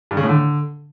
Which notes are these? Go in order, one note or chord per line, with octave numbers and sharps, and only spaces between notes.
G2
C#3
A2
D3